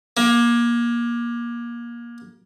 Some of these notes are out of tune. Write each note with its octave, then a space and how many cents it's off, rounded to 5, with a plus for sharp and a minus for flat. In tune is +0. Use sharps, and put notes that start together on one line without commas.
A#3 +25